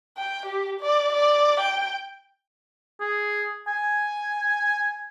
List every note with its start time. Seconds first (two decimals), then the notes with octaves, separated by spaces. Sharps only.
0.18 G5
0.46 G4
0.81 D5
1.13 D5
1.61 G5
3.00 G#4
3.68 G#5